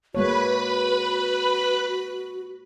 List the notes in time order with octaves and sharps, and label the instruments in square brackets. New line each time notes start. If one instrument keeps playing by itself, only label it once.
[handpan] G#3 A#3 C#5 [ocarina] F#4 [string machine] B4 B5